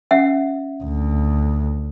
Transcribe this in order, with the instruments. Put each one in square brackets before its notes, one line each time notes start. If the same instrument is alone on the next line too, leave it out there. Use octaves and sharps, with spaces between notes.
[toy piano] C#4 E5 F#5
[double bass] D2